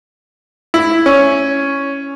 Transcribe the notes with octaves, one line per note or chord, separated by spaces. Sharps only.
E4
C#4